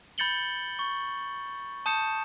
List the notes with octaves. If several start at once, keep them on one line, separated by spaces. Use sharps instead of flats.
B5 G6 A6 C#7 F#7 G7
C#6
A5 D#6 G6 C#7 E7